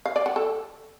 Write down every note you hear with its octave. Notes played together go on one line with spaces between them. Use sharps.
F5
D5
F#5
A4